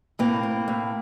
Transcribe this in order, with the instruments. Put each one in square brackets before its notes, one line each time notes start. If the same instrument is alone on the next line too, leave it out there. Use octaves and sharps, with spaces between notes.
[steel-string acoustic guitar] A2 A#3 C4
A2
A2